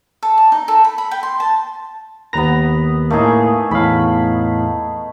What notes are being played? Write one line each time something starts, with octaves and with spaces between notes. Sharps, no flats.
A4
D5
D#4
A4
B5
B5
G5
C6
A5
D#2 B3 B4 A#5 A#6
A2 A3 A#3 D#4 G#4
E2 A2 F5 B5